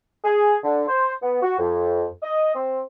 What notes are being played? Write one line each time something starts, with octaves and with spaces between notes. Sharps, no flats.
G#4
D3
C5
B3
F#4
F2
D#5
C4